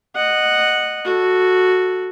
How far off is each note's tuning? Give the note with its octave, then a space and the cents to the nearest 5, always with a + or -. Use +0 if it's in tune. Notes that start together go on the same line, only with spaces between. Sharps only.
D#5 -15 F#5 +0
F#4 -5 A4 +0